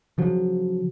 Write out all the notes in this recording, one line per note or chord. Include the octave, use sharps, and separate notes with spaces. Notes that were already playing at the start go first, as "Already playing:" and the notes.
C#3 F3 F#3